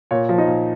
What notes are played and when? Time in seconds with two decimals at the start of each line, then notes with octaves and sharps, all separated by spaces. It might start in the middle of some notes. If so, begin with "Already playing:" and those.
0.11 A#2 C#5
0.29 F3
0.38 D#4
0.48 A#2